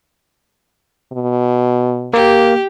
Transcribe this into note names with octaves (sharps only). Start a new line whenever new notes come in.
B2
A#3 G4